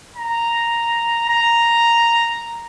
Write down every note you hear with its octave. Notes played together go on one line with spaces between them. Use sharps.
A#5
A#5